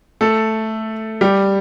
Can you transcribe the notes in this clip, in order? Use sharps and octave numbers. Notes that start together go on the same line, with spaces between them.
A3 A4
G3 G4